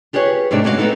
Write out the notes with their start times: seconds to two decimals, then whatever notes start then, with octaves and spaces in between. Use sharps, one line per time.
0.13 F4 G4 G#4 B4 C#5
0.51 G#2 C3 A3 D4 G4
0.64 A#2 G#3 C#4 F#4 C5 F5
0.78 B3 C4 D#4 E4 A4